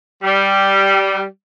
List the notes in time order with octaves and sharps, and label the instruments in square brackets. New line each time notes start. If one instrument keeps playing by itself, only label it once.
[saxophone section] G3